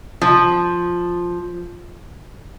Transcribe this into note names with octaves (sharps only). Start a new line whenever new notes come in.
F3